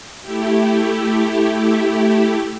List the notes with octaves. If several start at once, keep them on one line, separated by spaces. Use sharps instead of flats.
A3 E4 G4